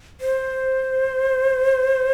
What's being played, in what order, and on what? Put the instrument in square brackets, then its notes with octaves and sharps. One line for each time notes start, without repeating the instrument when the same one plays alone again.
[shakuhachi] C5